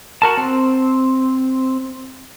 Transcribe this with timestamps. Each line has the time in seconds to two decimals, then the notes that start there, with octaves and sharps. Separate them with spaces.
0.22 F#4 A#4 A5
0.37 C4